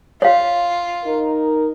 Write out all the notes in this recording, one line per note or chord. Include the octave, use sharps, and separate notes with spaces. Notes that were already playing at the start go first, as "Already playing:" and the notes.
F4 C#5 F5
D#4 A#4